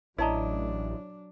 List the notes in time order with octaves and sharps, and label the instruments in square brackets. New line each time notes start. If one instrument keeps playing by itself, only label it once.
[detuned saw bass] A1 [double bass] F#3 D4 [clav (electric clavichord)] E4 D#5 [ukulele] C#5 A5 A#5